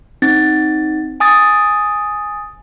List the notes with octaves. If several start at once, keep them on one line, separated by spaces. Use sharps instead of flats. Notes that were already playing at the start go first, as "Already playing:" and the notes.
C4 D#4 A6
G#5 D#6 A6